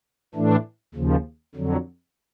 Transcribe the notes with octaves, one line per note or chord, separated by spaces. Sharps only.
A2 E3 A3 D4
D#2 C#3 F3
F2 D3 F#3